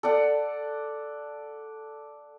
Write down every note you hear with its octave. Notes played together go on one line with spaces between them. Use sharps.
A4 D5 F#5